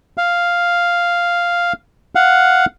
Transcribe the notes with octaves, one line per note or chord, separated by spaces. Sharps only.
F5
F5 F#5